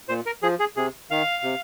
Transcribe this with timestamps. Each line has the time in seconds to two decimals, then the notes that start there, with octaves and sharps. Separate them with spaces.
0.09 A#2 C5
0.26 A#4
0.43 F3 G#4
0.60 G#4
0.76 C3 G#4
1.10 D#3 F5
1.43 C3